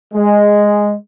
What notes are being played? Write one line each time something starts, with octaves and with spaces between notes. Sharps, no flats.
G#3